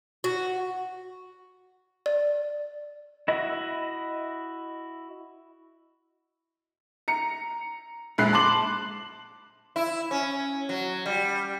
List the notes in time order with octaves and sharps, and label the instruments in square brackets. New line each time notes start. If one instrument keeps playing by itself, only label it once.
[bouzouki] F#4
[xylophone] D5
[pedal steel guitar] E4 F#4 D#5 E5 B5
[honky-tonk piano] A#5 C#7
A#1 G#3 B5 F#6 C7
A5 C6 D6 F#7
[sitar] E4
C#4
F#3
G3